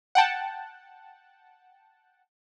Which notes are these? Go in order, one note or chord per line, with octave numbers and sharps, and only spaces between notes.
F#5 G5 A5